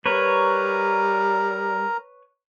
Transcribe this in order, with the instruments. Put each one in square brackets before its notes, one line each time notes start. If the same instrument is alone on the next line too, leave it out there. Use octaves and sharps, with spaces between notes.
[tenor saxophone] G3 [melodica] A#4 A#5 [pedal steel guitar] B4 C#5